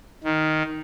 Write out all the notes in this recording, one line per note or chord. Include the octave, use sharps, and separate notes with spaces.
D#3